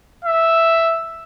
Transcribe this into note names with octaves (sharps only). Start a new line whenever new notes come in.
E5